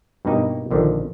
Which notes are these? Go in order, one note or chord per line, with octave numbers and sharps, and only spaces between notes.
G2 B2 A#3 D#4 G4 D#5
A#1 D3 D#3 F3